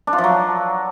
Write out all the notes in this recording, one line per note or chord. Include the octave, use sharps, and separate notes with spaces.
D4
F4
F3
F#3